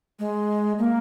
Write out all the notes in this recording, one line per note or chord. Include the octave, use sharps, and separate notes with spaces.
G#3
A#3